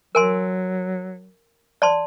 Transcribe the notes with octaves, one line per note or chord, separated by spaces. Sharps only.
F#3 A#4 G#5 C6
D5 A5 C6